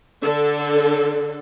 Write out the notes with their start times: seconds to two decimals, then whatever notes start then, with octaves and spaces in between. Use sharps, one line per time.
0.24 D3 A4